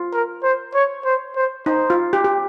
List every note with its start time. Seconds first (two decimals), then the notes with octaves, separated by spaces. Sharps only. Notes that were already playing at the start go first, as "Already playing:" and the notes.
Already playing: F4
0.13 A#4
0.43 C5
0.74 C#5
1.05 C5
1.36 C5
1.66 D#4 C5
1.90 F4
2.13 G4
2.25 G4